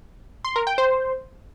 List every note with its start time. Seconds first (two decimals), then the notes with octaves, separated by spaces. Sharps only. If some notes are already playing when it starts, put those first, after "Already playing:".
0.45 C6
0.56 A#4
0.67 G5
0.78 C5